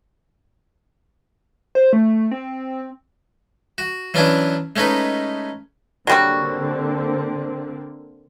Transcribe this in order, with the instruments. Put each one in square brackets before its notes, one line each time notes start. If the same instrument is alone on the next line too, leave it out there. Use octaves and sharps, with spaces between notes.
[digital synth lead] C5
A3
C4
[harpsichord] F#4
E3 F#3 B3 C#4 D4 E4
G#3 A3 C#4 D#4 B4
[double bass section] D3 A#3 C4 [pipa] F#3 G3 F#4